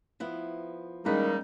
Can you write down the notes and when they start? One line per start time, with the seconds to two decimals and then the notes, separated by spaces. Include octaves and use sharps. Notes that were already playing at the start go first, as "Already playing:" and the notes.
0.20 F3 B3 E4
1.05 D#3 G3 G#3 A#3 B3 C#4 D#4 B4